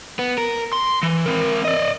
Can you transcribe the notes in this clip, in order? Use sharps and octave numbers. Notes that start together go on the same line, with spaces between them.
B3
A#4
C6
E3
C4 A#4
D5 D#5